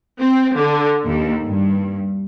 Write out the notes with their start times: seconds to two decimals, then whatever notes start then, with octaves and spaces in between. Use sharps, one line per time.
0.20 C4
0.56 D3
1.06 D#2
1.45 G2